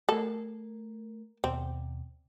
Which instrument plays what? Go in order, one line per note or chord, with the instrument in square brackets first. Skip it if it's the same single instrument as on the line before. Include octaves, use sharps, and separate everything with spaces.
[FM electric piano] A3 A#4 [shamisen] A4
[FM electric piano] D#2 B2 [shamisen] C4